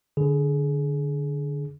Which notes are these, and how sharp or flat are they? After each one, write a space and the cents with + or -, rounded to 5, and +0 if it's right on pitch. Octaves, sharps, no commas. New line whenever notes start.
D3 +0 G#4 +20